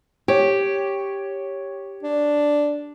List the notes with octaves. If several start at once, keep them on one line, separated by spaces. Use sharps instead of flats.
G4 C#5
D4